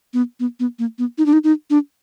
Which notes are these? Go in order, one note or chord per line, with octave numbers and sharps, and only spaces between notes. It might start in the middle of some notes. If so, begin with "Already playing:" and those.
B3
B3
B3
A#3
B3
D#4
D4
D#4
D#4
D4